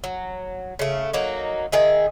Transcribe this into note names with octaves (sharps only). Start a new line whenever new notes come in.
F#3
C#3 A3
F#3 A#3 D#4
D#3 G#4 E5